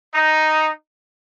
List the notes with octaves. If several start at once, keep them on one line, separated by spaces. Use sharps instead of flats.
D#4